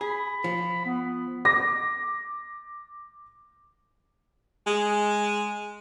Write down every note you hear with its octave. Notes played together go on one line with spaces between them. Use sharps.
G#4 B5
F3
B3
D6 A#6
G#3